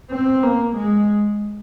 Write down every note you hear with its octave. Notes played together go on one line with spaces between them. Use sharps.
C4
A#3
G#3